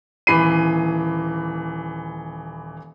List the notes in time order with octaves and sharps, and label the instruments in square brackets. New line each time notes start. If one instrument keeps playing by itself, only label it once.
[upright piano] D#1 E3 B5 C7 D#7